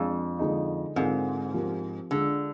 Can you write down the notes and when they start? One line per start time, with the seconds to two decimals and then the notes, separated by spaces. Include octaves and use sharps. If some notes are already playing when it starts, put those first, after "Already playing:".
Already playing: F2 G#3 D4 G#4
0.39 D3 F3 G#3 D#4
0.96 G#2 D3 G#3 C4 F4 A#4
1.54 F3 C4 G4 A#4
2.11 D3 G#3 D4 F4 G#4